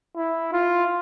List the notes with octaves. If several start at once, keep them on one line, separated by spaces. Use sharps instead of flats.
E4
F4